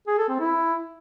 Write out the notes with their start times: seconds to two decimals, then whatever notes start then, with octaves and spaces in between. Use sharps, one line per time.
0.07 G#4
0.18 A4
0.29 C4
0.40 E4